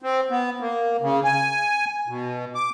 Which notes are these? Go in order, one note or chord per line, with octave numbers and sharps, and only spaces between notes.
C4
B3
A#3
C#3
G#5
B2
D6